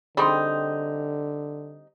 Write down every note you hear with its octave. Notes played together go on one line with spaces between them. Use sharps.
D3 G3 C4 D#4 G#4 G5 C6